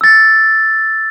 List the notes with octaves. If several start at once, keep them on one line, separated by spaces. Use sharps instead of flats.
E6 A6